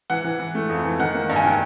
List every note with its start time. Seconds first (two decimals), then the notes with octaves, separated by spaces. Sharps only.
0.10 E3 F#5
0.24 E3
0.40 E3
0.55 A3
0.69 F2
0.84 E3
0.99 D#3 F#5
1.15 A#3
1.30 G2
1.36 G#5
1.44 D#3 G5